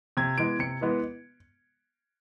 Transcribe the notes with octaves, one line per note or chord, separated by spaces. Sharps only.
C3 G#6
E3 G#3 B3 D7
C3 C#7
E3 G#3 B3